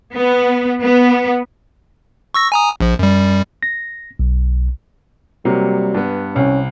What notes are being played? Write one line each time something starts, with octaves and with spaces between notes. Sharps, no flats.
B3
B3
C#6 E6 A#6
G#5 A#5 D#6
A#1 F3
F#2 G3
A#6
B1
C3 F#3 G3 A#3
G2 B3
C2 C#4